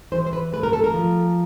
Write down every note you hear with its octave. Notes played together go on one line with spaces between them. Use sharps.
E3 C5
C5
B4
A3 B4
A#4
A4
A#4
F3